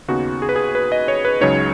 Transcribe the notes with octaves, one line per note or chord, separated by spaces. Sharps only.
D#2 C#3 B3 D#4 F#4
G#4
B4
G#4
B4
D#5
C#5
B4
C#2 C#3 F#3 D#4 C#5